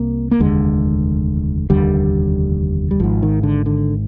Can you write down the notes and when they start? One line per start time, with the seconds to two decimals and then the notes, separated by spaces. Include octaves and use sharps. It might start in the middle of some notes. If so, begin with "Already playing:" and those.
Already playing: C2 C3 A#3
0.31 A#3
0.40 F1 D#2 D3 G#3
1.70 F1 D#2 D3 G3
2.91 G3
3.00 G#1 G#2 F3
3.23 D#3
3.43 D3
3.66 D3